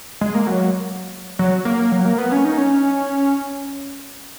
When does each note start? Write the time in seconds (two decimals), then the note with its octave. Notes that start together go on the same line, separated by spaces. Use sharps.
0.21 G#3
0.35 A#3
0.47 F#3
1.39 F#3
1.65 A#3
1.79 A#3
1.92 F#3
2.05 A#3
2.18 B3
2.32 C#4
2.45 D#4
2.58 C#4